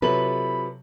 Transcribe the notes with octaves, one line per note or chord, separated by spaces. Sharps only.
C3 F#3 F4 A4 B4 B5 F#7